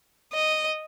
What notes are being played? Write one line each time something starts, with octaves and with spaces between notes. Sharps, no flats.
D#5